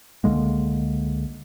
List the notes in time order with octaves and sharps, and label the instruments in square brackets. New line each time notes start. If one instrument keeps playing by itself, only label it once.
[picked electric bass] C#2 D3 G#3 A#3